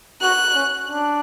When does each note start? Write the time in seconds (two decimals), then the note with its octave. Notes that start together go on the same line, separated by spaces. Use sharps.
0.22 F#4 F#6
0.55 C#4
0.88 D4